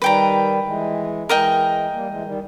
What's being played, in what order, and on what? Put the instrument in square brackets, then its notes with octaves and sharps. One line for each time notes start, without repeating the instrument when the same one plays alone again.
[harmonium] D#3 G3 [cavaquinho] B4 G5 A#5
[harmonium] E3 G#3
[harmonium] E3 G#3 [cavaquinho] A#4 D#5 G5
[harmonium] G3 A#3
E3 G#3
D#3 G3